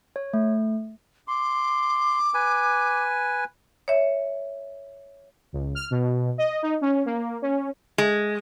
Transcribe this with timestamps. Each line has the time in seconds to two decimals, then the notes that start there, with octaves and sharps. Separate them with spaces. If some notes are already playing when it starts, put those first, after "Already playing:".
0.16 C#5
0.33 A3
1.28 C6 D6
2.34 B4 G#5
3.88 C#5 E5
5.53 C#2
5.75 F6
5.90 B2
6.38 D#5
6.62 D#4
6.81 C#4
7.06 A#3
7.42 C#4
7.98 G#3